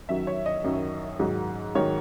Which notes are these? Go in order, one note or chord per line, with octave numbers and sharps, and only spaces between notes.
F#2 D#3 F#3 E5
C#5
D#5
F#2 D#3 F#3
G#2 D#3 F#3
G#2 D#3 F#3 C#5